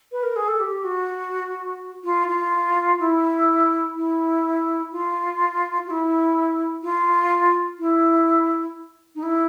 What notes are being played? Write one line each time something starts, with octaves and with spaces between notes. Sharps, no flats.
B4
A#4
G#4
A4
G4
F#4
F4
F4
E4
E4
F4
F#4
E4
F4
E4
D#4
E4